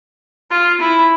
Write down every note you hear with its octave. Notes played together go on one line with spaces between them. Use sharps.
F4
E4